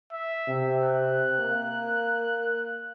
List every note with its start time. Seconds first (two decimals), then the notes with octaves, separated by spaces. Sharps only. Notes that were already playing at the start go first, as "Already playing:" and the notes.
0.13 E5
0.48 C3
0.83 F#6
1.40 A#3